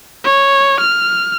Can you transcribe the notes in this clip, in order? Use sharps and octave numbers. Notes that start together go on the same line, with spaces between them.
C#5
F6